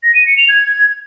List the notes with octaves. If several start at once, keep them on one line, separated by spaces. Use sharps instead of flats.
A#6
D#7
C#7
F7
G#6